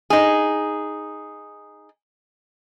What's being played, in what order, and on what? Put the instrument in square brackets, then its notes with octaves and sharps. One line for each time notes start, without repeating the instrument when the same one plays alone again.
[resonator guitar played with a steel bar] D#4 G#4